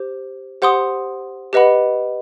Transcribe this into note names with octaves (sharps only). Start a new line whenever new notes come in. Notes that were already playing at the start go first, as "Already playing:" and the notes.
Already playing: G4 C5
G4 C5 F#5 C6 D#6
G4 B4 D#5 F#5 B5